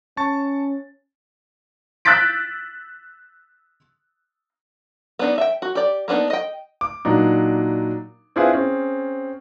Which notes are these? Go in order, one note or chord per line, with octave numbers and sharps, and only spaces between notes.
C#4 A5 C#6 A6
E6 F#6 G6 A6 B6 D7
B3 D4 D#4
E5 G5
F#4
G4 D5
A#3 B3 D4 D#4
D#5 G5
D6
A#2 F#3 D4 D#4
C4 D4 E4 F4 G#4 B4
C4 C#4 G#4